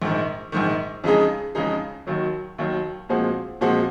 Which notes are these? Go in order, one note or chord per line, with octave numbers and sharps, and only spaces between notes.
A#1 G#2 D#3
A#1 G#2 D#3
F2 C#3 G#3 D#4 G#4
F2 C#3 G#3 D#4 G#4
D#2 D#3 F#3
D#2 D#3 F#3
A#2 F3 G#3 C4 F#4
A#2 F3 G#3 C4 F#4